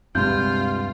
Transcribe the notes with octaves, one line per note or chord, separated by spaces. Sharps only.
D2 G2 C3 G#3 F4 G6